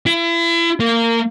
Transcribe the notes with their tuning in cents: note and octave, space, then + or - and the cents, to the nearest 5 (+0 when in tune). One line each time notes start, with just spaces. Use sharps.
E4 +35
A#3 -20